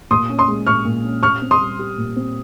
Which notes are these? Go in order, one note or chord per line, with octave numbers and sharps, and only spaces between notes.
A#2 C6 D#6
C#4
C6 D#6
G#3
A#2 C#6 F6
A#2
C#4
A#2 C#6 F6
C4
C6 D#6
G3
G4
A#2
C4